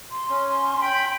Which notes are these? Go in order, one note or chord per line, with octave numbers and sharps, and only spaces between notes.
C6
C#4
G5 B5